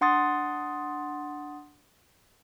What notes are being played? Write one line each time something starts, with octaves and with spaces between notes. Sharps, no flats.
D4 F#5 C6 D#6 A6